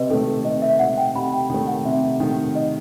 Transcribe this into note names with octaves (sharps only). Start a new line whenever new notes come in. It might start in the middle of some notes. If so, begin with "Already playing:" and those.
Already playing: C3 B4 D#5
D#3 A3 A4
B4
C3 D#5
E5
D#3 A3 F#5
G5
C3 B5
G5
D#3 A3 G5
F#5
C3 E5
D#3 A3
D#5